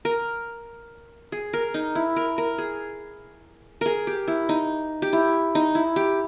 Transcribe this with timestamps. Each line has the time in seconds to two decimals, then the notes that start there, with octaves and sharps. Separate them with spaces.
0.05 A#4
1.32 G#4
1.53 A#4
1.74 D#4
1.95 E4
2.16 A#4
2.38 A#4
2.58 G#4
3.81 G#4 A#4
4.07 G4
4.28 E4
4.49 D#4
5.02 G4
5.13 E4
5.55 D#4
5.75 E4
5.96 G4